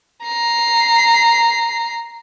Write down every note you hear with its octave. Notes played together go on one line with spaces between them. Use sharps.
A#5 C7